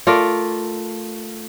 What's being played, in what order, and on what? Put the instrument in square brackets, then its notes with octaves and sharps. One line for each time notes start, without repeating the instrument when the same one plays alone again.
[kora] A3 F4 A#4 D5